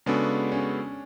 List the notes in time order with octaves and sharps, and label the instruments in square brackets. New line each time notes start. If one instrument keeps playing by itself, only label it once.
[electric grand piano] C#3 G#3 B3 F#4 A4 [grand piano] D4
[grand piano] C#4